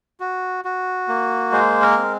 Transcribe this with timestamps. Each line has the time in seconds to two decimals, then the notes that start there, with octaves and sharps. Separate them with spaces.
0.20 F#4
0.65 F#4
1.08 A#3
1.52 G#3 C5
1.82 A#4
1.96 C4